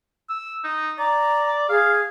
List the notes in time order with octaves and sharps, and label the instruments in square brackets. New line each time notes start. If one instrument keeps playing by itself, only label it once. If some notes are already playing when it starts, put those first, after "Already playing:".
[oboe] E6
D#4
[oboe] D5 [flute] A#5
[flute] G#4 [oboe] F5